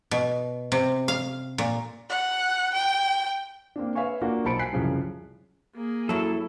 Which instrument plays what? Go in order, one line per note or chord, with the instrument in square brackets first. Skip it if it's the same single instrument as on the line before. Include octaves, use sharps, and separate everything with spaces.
[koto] B2
C3
F5
A#2
[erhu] F#5
G5
[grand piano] A#3 C4 D4
B4 C#5 E5 F5 G#5 C#6
A#3 D4 F4 F#4 A#4
B1 C5 A5 B5 C#7 D7
G#5 F#6 B6 C7 D7
C2 F#2 C#3 F3
[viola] A#3 G#4
[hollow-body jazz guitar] F#2 F#3 [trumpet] E4 [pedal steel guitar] A4